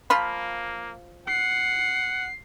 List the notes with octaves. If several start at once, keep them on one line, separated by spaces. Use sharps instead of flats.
F3 A#3 F4 B5
F#5 C7